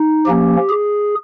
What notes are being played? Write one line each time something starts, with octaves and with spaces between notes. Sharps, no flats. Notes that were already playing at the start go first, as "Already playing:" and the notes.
Already playing: D#4
F3 A#3 C#4 G4
G#4